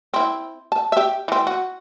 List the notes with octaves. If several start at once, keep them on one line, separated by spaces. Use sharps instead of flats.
C4 E4
A5
G4 E5
E3 C4
F#4